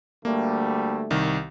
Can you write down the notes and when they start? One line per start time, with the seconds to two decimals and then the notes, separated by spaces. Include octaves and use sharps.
0.25 D2 G3 A3 A#3
1.11 C2 D#3